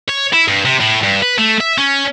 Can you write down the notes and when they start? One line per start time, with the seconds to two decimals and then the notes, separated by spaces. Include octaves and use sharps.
0.08 C#5
0.33 E4
0.48 G2
0.65 C3
0.80 A2
1.03 G2
1.23 B4
1.38 A3
1.61 E5
1.78 C#4